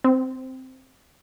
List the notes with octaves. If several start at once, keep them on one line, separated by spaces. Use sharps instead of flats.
C4